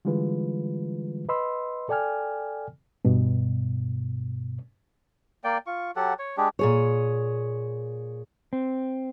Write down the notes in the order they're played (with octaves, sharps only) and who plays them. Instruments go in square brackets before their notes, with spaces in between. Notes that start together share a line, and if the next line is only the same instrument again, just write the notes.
[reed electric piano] D3 E3 G3 G#3 F4 B4
B4 D#5 B5 C6 E6
A4 D5 G5 G#5 F6
G2 B2
[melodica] A#3 D5 G5
F4 C#6
F#3 G4 A4 F#5
C#5
G#3 D4 G4
[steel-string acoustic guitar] A#2 G#4 C#5
[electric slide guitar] C4